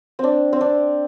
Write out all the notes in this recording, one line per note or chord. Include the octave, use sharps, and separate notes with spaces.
C4 D4
C4
D4